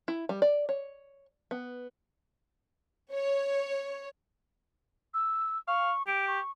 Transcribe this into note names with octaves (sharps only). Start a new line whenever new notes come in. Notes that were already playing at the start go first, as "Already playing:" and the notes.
E4
G3
D5
C#5
B3
C#5
E6
F5 C#6
G4 D7
C#6